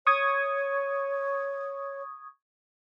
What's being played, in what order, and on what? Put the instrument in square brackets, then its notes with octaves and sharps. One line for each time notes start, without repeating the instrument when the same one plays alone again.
[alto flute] C#5 [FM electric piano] C#6 D#6 G#6